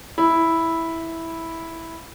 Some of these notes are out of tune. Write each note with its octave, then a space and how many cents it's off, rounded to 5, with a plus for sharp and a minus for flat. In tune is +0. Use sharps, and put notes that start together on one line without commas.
E4 -5